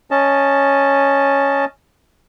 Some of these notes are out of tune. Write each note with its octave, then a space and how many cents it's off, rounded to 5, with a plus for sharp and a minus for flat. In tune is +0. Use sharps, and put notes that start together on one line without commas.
C#4 +0 D#5 +0 A5 +0